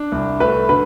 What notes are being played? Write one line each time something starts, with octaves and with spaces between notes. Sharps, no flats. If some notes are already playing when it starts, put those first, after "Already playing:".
Already playing: D4
C2
A3 B4
D3 B4